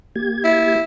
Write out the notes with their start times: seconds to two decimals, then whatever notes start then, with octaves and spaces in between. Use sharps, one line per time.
0.15 A#3 G4 G#6
0.44 E4